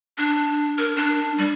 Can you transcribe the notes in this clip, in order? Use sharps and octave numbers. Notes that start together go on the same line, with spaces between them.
D4
A#4
D4
G3